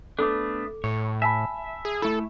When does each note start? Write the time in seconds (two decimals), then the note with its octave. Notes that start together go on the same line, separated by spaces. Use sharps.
0.19 A3 B3 D4 A4 D6
0.84 A2 C#5
1.22 E5 G#5 A5 B5
1.85 G#4
2.02 A3 E4 A4